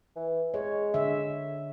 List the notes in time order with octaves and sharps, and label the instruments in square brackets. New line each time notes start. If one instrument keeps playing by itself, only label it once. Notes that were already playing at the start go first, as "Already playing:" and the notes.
[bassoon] E3
[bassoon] G#3 [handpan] C#5
[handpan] D3 E5